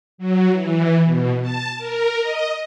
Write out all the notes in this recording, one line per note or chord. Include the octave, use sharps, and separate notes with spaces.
F#3
E3
B2
A5
A#4
D#5